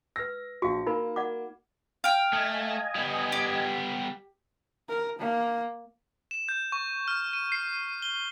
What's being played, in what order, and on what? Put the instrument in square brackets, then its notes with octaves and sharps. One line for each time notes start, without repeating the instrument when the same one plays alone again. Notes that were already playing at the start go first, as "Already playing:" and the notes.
[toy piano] B4 E6 [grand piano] A#6
[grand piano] A#1 C#6 [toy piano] F#4 F5
[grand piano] A#3 [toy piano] D#4 A#4 B5
[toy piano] D5 F#5 D6
[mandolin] F5 G5
[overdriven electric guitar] A3 [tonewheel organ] D#5 G#5
[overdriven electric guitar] G3 B3
[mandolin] G4
[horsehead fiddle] A#4
A#3
[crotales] E7
G6
C#6
F6
D#7
C7
G7